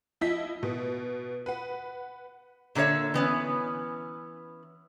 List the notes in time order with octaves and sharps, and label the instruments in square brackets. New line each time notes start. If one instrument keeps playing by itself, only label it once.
[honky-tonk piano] F3 E4 D#5 B6
B2
B4 F#5
[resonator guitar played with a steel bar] A#2 D3 G4 C#5 E5
E3 B3 C#4